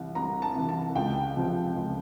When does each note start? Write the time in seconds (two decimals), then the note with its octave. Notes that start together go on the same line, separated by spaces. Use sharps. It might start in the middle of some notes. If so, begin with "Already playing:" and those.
Already playing: C2 C3 E3
0.15 C2 A#5
0.42 A5
0.55 C3 E3
0.69 A5
0.95 C#2 G5
1.35 C3 F3
1.75 C#2